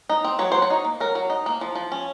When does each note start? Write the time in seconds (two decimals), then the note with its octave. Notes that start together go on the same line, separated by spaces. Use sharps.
0.09 D#4
0.24 C4
0.39 F#3 C#5
0.52 F#3 C5
0.62 C#5
0.70 D#4
0.85 A#3
1.00 F#3 A#4
1.15 F#3
1.30 D#4
1.46 A#3
1.61 F3
1.75 F3
1.92 C#4